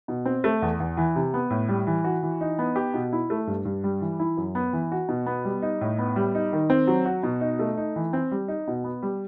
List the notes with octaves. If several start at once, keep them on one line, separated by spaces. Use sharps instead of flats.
B2
C4
A3
E2
E2
E3
C3
B3
A2
G3
E3
F#4
E3
D#4
B3
G4
B2
E4
A3
G2
G2
G3
E3
E4
F#2
B3
E3
F#4
B2
B3
G3
D#4
A2
B3
G3
D#4
D#3
C4
F#3
F#4
B2
D#4
A3
D#4
E3
C4
G3
D#4
B2
B3
G3